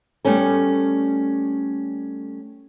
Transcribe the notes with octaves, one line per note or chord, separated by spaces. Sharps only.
G3 A3 B3 C#4 A4